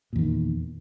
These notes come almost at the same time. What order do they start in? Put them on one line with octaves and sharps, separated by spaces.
A#2 E2 D#3